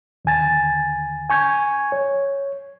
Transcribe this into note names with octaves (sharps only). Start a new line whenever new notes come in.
D#2 D3 G#5 A6
G#5 C#6 G6 G#6
C#5